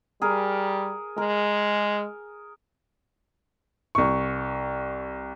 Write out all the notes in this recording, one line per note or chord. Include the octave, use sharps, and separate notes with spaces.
G3 G#4 A#4
G#3 A#4
C2 C#6